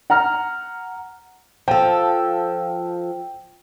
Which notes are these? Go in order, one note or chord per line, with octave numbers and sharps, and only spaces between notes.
F#5 A#5 F6
F3 A4 G5